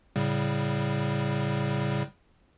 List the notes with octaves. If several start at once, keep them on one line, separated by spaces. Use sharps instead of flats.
A2 C#3 G3